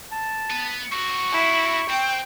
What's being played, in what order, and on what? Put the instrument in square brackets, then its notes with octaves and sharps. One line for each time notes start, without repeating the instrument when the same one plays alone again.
[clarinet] A5
[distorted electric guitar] B3 B4
[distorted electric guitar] C4 F#4 [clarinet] C#6
[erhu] E4
[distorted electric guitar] C4 [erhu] G5